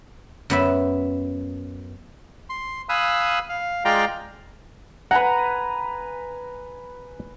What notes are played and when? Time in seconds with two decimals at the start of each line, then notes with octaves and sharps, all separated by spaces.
0.50 F#2 B3 E5
2.49 C6
2.89 F5 G#5 B5 D#6 E6 F#6
3.49 F5
3.85 G#3 F4 D5 F5 G5 A#5
5.11 B4 F#5 G#5 A#5